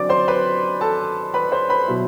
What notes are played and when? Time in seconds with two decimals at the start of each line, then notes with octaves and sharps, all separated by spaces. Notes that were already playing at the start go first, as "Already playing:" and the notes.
Already playing: D3 F#3 C4 D5 D6
0.09 C5 C6
0.28 B4 B5
0.81 A4 A5
1.34 B4 B5
1.52 C5 C6
1.69 B4 B5
1.88 B2 F#3 B3 E4